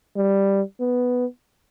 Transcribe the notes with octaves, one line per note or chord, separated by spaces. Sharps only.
G3
B3